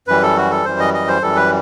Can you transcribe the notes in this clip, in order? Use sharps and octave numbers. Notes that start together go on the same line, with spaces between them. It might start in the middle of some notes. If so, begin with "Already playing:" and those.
F#2 E3 G3 B4
A4
F#4
A4
F#2 E3 G3 C5
D#5
D#5
C5
F#2 E3 G3 A4
B4